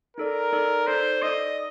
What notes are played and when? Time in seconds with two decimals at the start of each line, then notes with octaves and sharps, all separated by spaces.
0.17 D#4 A4 A#4 D5
0.52 D#4 A4 D5
0.87 D#4 A4 C5 D5
1.22 D#4 A4 D5 D#5